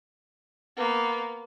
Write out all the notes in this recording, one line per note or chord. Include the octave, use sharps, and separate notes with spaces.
A#3 B3